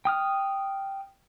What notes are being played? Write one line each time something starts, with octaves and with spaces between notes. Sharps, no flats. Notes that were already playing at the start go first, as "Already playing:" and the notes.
G5 D#6 F6